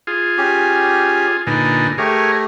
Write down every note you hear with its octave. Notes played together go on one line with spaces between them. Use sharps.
F4 G#4
C#4 G4
A#2 D3 D#4 B4 G#5
A3 G4 G#4 A#4 C#5